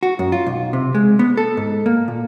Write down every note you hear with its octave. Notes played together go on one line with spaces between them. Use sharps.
F#4
F#2
F4
B1
C3
G#3
B3
A4
G#2
A#3
A#2